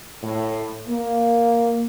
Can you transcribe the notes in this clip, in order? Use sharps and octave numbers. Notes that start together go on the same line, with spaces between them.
A2
A#3